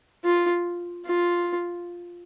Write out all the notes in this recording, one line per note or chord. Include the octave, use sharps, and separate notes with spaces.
F4
F4